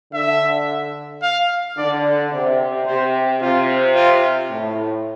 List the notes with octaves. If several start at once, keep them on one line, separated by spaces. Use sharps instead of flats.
D3 E5
F5
D3 D5
C3 D5
C3 C5
C3 F4
F4
A2